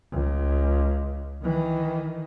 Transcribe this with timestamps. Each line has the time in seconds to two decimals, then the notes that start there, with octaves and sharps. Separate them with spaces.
0.12 C#2
1.43 D#3 E3